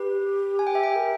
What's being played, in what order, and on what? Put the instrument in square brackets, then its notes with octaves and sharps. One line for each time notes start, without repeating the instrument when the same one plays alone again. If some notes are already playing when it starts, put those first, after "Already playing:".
Already playing: [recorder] G4 [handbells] B4
[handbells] G#5
G5
E5
G5
[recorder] A#4